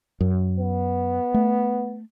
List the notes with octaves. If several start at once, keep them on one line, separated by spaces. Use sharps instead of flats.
F#2
B3
A3